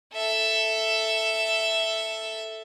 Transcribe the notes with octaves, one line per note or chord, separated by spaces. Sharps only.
A4 E5